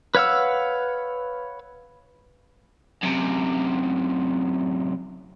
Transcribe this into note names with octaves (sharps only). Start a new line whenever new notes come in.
B4 C#5 F5 F#5 E6
F#2 C3